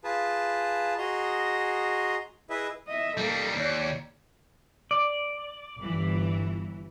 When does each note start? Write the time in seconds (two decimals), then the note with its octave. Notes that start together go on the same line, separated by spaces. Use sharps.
0.04 F4 G#4 B4 A5
0.98 F#4 G#4 D#5 A#5 C6
2.50 E4 G#4 B4 D#5 E5
2.88 D#5 E5
3.17 G3 A#3 D#4 A4
3.55 D#2 C#5 D5
4.91 D5
5.79 G1 E3